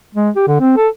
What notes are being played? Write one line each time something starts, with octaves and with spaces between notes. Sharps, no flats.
G#3
G4
D3
C4
A4